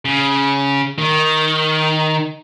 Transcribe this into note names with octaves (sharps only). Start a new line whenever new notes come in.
C#3
D#3